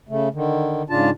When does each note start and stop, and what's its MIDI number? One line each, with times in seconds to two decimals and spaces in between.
0.09 0.28 49
0.09 0.28 57
0.34 0.83 50
0.34 0.83 51
0.90 1.10 44
0.90 1.10 49
0.90 1.10 62
0.90 1.10 65
0.90 1.10 81